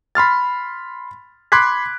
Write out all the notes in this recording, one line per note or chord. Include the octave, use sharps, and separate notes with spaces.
B5 C6 F6 A6
B5 C6 D6 F#6 G#6 B6